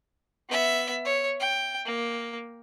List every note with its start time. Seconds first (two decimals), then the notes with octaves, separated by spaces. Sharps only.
0.49 B3 E5
1.05 C#5
1.40 G5
1.85 A#3